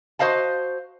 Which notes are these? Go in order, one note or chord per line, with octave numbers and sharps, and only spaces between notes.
F#4 C5 D#5 F5 A5